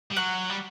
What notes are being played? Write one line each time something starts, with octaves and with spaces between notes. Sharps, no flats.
G3
F#3 F#5
G3